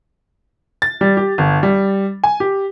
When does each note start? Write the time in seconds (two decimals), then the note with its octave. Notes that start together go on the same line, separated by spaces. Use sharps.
0.82 A6
1.01 G3
1.17 G4
1.38 G1
1.63 G3
2.24 G#5
2.40 G4